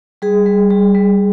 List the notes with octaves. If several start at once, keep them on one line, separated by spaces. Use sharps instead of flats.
G3 G#4
G3
G3
G3